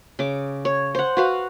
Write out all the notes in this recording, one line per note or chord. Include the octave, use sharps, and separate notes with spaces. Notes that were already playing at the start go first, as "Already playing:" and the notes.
C#3 D6
C#5
C5 F#5
F#4 B4 F5